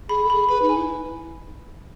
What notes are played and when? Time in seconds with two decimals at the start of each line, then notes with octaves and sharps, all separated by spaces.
0.09 G#4 B5
0.24 A4
0.29 G#4 B5
0.49 B4 B5
0.62 D#4
0.69 G#5
0.76 E4